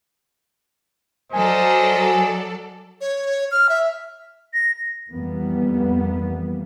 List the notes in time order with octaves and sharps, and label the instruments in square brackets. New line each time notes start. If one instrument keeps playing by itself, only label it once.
[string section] F#3 A4 D5 [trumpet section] A#4 C5 D#5 [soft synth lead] G#5
[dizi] C#5
F6
E5
[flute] A#6
[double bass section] F2 E3 G3 A#3 B3